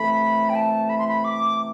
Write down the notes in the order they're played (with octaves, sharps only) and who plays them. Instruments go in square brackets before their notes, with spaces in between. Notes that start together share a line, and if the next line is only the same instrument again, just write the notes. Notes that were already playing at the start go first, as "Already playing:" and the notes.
Already playing: [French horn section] C3 E3 A3 [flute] B5
[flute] G5
A5
B5
C6
B5
D6